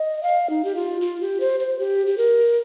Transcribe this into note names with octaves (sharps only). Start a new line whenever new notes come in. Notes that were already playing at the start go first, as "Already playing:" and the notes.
Already playing: D#5
F5
D#4
G4
F4
F4
G4
C5
C5
G4
G4
A#4